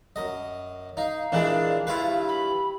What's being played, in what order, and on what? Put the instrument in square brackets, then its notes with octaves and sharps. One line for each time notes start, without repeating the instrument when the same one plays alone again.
[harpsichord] F#2 D#5
[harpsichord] D#4 [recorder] F5
[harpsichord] A#2 E3 G#3 [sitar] D4
[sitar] G2 [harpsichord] E4 F4 B4
[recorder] B5